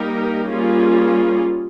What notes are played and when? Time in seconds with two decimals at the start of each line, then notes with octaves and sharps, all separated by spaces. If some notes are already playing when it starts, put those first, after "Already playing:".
Already playing: G3 A#3 D#4 G4 A#4
0.49 G3 A#3 C#4 F4 G#4